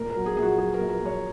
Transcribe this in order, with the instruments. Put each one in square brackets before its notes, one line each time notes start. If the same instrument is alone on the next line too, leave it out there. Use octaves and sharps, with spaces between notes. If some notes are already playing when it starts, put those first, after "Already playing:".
Already playing: [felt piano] A#2 A#4
A#4
F#3
G#4
A#1 G#4
F#4
F#3 G#4
A#4
A#1
A#4
A#1
C#5